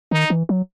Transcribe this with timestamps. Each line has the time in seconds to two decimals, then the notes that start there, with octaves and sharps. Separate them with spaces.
0.11 D#3 D#4
0.30 E3
0.49 F#3